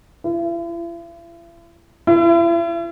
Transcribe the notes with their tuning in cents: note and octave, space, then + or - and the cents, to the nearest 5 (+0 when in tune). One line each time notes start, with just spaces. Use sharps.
E4 +45
E4 +40